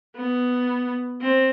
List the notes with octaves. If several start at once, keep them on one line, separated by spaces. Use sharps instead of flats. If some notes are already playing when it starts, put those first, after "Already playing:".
B3
C4